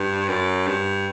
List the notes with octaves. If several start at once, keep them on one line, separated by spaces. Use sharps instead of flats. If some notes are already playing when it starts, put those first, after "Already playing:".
Already playing: G2
F#2
G2